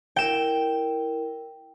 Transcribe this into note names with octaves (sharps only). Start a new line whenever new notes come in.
E4 A#4 G5 E7